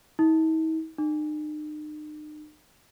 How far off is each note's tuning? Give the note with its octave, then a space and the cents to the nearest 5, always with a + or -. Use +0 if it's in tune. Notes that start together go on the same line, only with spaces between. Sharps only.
D#4 +45
D#4 -40